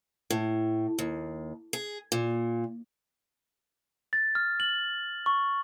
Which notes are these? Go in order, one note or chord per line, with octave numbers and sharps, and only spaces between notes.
A2
D#2
G#4
A#2
A6
F6
F#7
C#6